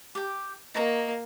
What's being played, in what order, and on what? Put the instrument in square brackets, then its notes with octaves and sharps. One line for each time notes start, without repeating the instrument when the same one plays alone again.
[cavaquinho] G4 G5
[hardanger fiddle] A#3 [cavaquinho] D#4 F#4 A#5